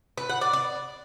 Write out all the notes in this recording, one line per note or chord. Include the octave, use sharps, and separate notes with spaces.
B4
F#5
D5
D5